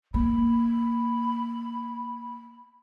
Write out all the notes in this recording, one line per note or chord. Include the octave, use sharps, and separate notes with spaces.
A#3 B5